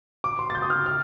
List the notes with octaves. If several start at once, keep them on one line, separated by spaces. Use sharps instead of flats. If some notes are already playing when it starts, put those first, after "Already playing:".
D6
C6
A6
G6
D#6
F6
F6